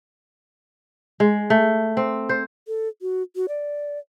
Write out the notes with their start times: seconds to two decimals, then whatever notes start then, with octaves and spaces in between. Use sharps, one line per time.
1.20 G#3
1.50 A3
1.97 C4
2.29 C5
2.68 A4
3.02 F#4
3.36 F#4
3.48 D5